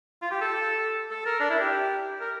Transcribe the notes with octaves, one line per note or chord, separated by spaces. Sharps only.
F4
G4
A4
A4
A#4
D4
E4
G4
A#4